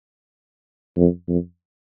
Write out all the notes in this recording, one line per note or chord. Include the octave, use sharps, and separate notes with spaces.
F2
F2